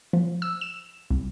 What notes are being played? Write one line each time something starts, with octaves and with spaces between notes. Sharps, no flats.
F3
E6
E7
C2